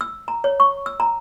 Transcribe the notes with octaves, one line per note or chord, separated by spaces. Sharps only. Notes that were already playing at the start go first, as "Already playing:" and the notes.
E6
A#5
C#5
C#6
E6
A#5